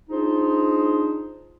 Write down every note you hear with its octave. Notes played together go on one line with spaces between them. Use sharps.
D4 D#4 F4 G#4 C5